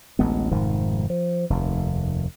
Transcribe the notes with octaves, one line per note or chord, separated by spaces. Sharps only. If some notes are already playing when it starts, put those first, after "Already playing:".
A1 D2 G#3 B3
F1 G#2 D#3 F3
F3
F1 D#2